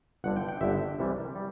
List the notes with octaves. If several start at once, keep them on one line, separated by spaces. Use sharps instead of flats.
G1 G2 D3 F#5
G5
G5
G1 G2 D3 E5
C2 C3 E3 G3
G3